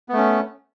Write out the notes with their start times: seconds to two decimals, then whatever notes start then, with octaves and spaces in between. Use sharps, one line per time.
0.09 B3
0.13 A3
0.17 C#4